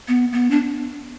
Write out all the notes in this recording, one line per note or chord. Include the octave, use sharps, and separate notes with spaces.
B3
B3
D4